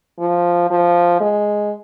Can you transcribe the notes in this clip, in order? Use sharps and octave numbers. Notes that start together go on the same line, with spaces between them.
F3
F3
G#3